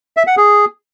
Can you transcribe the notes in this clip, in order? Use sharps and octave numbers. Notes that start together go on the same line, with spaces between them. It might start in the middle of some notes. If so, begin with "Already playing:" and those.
E5
F#5
G#4